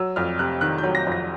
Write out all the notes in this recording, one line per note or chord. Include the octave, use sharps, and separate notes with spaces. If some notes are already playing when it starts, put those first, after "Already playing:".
Already playing: F#3 E6
F2 F6
C3 F#6
D#3 F#6
F#3 G6
A#6
F2
A#6